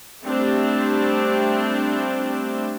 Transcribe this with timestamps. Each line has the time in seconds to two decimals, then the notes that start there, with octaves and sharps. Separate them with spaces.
0.24 G3 A3 C4 D4 E4 G4